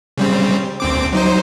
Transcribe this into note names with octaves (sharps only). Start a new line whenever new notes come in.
C#3 G3 C4
D2 C4 D6
F#3 D#4 C5